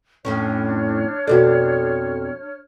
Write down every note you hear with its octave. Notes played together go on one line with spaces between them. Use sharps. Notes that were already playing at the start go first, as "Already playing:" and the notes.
F2 A2 C#4 D4 C#5 F6
F2 B2 F#4 A4 D5